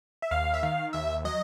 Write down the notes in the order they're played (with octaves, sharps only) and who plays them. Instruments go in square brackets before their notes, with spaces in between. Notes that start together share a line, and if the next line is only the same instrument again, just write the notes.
[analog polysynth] E5
D#2 F5
E5
D#3 F5
D#2 E5
F#3 D#5